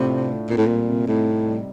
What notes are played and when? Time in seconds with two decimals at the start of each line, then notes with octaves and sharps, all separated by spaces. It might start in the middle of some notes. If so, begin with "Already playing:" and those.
Already playing: A2 C3 A3 D4 F4
0.11 D4
0.29 A3
0.50 A#2 C4
0.57 A2
0.66 A#2 G3
0.88 C3
1.08 A2 D#4
1.27 C4
1.46 G3